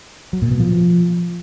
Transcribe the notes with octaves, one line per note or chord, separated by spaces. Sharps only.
F#3
A#2
B2
F3